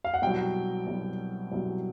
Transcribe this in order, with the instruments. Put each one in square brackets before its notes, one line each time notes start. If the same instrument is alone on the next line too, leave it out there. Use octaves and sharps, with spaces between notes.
[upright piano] F5
F#5
C2 B2 F#3 G5
C2 B2 F#3
C2 B2 F#3